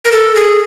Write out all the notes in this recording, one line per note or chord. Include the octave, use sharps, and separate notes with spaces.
A#4
A4
G#4